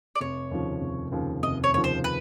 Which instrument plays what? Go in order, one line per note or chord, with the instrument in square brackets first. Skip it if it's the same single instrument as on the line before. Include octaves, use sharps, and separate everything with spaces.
[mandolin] D5
[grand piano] F1 [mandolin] C#5
[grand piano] D#2 C#3 F3
F1
D#2 C#3 F3
[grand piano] F1 [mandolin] D#5
[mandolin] C#5
[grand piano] D#2 C#3 F3 [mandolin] C#5
[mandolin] C5
B4